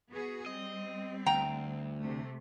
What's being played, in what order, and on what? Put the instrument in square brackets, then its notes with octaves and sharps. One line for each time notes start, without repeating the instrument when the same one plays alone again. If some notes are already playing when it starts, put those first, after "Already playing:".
[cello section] B3 F#4 G#4
[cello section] G3 C4 [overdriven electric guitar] D#5
[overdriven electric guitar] D2 [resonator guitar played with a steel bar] G5 A#5
[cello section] C3 A3